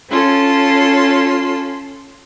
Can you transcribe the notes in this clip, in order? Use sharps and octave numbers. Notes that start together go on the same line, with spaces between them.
C#4 F4 A4 C6